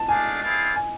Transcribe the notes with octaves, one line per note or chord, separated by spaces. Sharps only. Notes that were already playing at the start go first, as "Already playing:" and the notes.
Already playing: A5
A3 D4 G#4 D5 F5 G#5
C4 E4 G#4 D5 F5
G#5